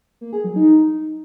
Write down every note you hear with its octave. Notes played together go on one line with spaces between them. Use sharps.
A#3
G#4
F#3
D#4